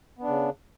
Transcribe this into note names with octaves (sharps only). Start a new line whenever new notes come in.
C#3 B3 D4